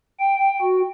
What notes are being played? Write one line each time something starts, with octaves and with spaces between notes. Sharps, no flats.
G5
F#4